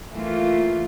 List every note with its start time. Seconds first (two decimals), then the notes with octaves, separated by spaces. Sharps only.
0.12 E3 A3 A#3 F4